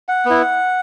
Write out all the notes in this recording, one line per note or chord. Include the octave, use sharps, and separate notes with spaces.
F#5
B3 E4